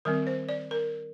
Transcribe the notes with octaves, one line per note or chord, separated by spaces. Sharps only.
D#3 G3 C4 A#4
C5
D5
A#4